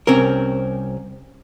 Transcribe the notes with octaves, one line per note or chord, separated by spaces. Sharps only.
C2 C4 C#4 A#4